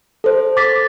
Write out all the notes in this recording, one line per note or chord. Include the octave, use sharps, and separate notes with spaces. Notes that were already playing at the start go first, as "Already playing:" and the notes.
A4 C5
D6 A6 B6